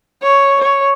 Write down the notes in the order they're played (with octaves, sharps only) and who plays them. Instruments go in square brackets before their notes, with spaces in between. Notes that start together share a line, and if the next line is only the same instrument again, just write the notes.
[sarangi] C#5
C#5